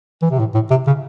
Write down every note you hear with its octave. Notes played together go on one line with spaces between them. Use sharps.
E3
C3
A2
A2
C3
C#3